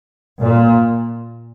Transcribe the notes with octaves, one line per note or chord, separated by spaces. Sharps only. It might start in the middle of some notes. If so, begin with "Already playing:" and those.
A#2